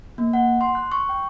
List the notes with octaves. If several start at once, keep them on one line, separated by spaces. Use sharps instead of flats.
A#3
F#5
C6
F#6
C#6
G5